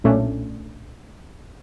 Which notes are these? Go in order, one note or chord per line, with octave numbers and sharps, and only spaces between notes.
B1 A#2 A3 C#4 D4